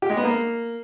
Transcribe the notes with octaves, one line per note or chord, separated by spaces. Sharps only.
G4
G#3
B3
A#3